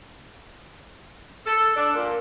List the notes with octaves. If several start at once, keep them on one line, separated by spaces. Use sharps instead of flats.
A4
D4
A#2